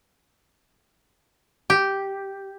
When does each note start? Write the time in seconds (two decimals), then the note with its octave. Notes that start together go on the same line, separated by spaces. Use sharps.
1.70 G4